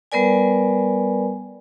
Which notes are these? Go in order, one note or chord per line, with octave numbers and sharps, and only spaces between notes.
G3 B3 A#4 B4 D5 G#5